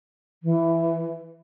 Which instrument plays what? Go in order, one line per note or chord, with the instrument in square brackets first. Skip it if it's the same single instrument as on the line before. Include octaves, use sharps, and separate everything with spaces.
[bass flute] E3